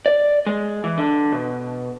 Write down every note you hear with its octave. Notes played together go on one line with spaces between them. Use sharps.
D5
G#3
E3
D3
B2